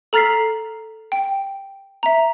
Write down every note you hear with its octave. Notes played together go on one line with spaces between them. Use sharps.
A4 A#5 F6 A6 B6 C7
G5
E5 A#5